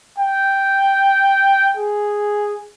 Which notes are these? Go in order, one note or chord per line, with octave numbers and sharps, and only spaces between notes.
G5
G#4